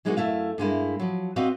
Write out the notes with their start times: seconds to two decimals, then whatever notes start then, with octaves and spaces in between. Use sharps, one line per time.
0.05 F#3 G#3 A#3 D#4 E4 F#4
0.17 F#2 A3 E4 F5
0.58 G2 G#3 A#3 E4
1.00 F3 F#3
1.36 C4 F#4 B4 D5 D#5 F5